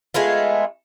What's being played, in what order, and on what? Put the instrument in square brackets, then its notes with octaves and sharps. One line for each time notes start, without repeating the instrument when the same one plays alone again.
[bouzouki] G#3 A3 B3 F4